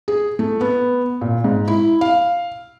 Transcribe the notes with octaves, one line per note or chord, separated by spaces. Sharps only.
G#4
A3
B3
A#2
G#2
E4
F5